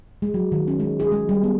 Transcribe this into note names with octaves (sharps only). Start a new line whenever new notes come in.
G#3
F#3
D#3
C#4
G#3
G#4
G#3
G3
B3